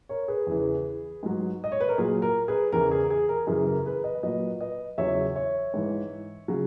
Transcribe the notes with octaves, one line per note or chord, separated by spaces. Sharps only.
A#4 C#5
G#4 B4
E2 C#3 E3
G#2 F#3
D#5
C#5
B4
A#4
A#2 F#3 G#4
A#4
G#4 B4
E2 C#3 E3 A#4
G#4
G#4
A#4
F#2 C#3 E3 G#4
A#4
G#4 B4
B4 D#5
A#2 F#3 B4 D#5
B4 D#5
E2 C#3 F#3 C#5 E5
C#5 E5
G#2 E3
C#3 F#3